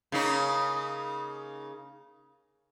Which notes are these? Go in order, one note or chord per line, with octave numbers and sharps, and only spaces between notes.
C#3 A#3 D#4